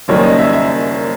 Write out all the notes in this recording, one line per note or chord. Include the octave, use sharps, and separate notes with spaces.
F#1 F#2 D#3 G3 A#3 C#5
D#5
E5
E5